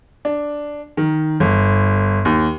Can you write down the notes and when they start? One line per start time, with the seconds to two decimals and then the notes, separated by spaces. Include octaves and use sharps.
0.25 D4
0.97 D#3
1.40 G1
2.25 D#2